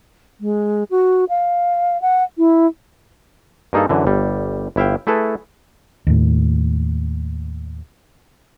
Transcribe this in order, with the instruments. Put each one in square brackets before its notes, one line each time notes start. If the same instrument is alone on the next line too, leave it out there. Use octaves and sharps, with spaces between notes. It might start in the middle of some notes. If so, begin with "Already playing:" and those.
[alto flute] G#3
F#4
F5
F#5
E4
[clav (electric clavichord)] G2 A#3 D#4 G#4 A4
F#2 D3 E3
G1 G3
G1 E4 E5 F5 G5
A3 E4 G#4 A4 B4
[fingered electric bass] D#2 A2